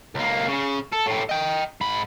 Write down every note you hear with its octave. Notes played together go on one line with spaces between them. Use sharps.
C#2 A#3
C#3 C#4
A4
A2 G4
D#5 G5
G#2 B5